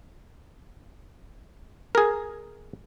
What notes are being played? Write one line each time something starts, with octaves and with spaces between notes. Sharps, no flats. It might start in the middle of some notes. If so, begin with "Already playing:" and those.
G#4 A#4